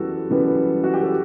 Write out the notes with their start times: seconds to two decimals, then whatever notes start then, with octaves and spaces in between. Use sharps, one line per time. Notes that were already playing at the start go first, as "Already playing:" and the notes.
Already playing: F#2 E3 G3 B3 F#4 A4
0.30 F#2 E3 G3 B3
0.84 F#4
0.94 G4
1.03 A4